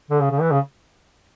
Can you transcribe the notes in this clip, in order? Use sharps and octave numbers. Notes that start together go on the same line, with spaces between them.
D3
C#3
C#3
E3
C#3